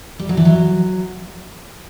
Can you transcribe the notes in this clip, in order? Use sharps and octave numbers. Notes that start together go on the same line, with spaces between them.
G3
F#3
E3
F#3